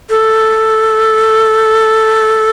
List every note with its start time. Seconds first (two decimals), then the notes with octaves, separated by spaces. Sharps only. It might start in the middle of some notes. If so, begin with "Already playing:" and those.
0.10 A4